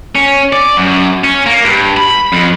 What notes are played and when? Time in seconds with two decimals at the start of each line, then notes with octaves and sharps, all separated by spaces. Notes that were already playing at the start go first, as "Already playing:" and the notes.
0.15 C#4
0.53 D5
0.77 F#2
1.24 C#4
1.46 A#3
1.64 G2
1.97 B5
2.33 F2